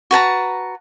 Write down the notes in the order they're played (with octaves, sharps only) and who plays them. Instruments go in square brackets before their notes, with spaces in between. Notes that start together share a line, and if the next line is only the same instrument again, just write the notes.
[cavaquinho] F#4 B4 A5 A#5